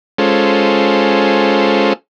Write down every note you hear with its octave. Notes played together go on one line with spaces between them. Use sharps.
G#3 C#4 F4 A4 C5